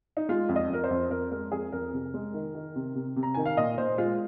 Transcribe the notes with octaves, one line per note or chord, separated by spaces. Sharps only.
D#4
G#3 F4
F2
D#5
F2 A#4
C5
F2
F2 A#4
G#3 A#4
F2 G#4
F2 A#4
C3
G#3
D#3
D#3
C3
C3
C3
A#5
D#3 G#5
F5
A#2 D#5
A#2 C5
G#3 F4